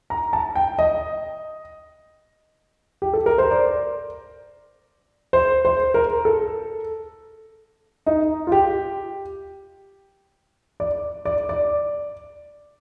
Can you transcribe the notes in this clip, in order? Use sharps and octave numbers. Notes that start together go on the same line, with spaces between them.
A#5
A5
G5
D#5
G4
A4
A#4
C5
D5
C5
C5
A#4
A4
D#4
F4
G4
D5
D5
D5